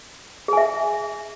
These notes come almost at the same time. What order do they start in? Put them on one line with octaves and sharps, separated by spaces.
G#4 G#5 E5